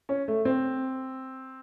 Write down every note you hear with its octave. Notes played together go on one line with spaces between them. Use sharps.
C#4
A3
C4